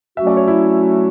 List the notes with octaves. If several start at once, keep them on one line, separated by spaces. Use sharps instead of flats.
F#3 A3 C#4 F#4 E5
D5
C#5
E4